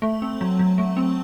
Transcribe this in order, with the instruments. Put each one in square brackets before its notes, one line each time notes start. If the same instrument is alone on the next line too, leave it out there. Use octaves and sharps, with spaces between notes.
[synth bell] A3
C4
F#3
F#3
A3
C4